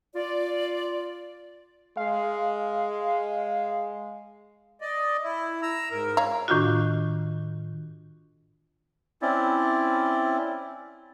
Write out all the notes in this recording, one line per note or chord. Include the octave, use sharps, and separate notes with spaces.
F4 D5
G#3 F5
D5 D#5
E4
A#5 E6
G#2 A#4
C#5 F5 A#5
A2 D#3 D4 F4 F#4
C4 C#4 E4 D5